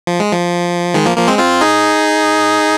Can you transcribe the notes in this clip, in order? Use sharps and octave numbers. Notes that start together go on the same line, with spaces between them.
F3
G#3
F3
D#3 G#3
F3 A#3
F3 A#3
G#3 C4
C4 F4
D#4 G#4